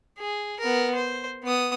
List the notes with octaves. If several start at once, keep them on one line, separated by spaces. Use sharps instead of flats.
G#4
B3 A#4
C5
B3 D#6